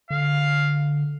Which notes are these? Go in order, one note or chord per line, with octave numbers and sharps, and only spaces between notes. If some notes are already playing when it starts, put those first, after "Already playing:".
D3 F5